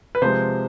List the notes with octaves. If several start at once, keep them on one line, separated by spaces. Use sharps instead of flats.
B4
C3 F3 G#3 C5